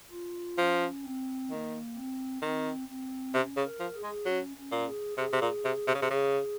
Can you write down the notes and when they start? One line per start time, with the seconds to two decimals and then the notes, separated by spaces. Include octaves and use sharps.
0.11 F4
0.57 F3 C#4
1.03 C4
1.50 D#3 A#3
1.95 C4
2.42 D#3 C4
2.88 C4
3.34 C3 C#4
3.57 C#3
3.64 A#4
3.80 F3
3.95 G#4
4.03 G#3
4.26 F#3 C#4
4.57 C#4
4.72 A#2
4.87 G#4
5.18 C3 G#4
5.33 C3
5.41 A#2
5.65 C3
5.87 C3
5.95 C#3
6.02 C3
6.10 C#3